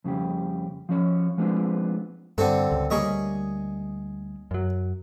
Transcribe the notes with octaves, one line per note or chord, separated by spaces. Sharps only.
F2 C#3 G3 G4
F3 C#4 C#5
F3 G#3 B3 C4 D4 F4
G2 D3 C4 A4
C#2
D2 G3 A#3 G#4 C#5 D#5
F#2 F#3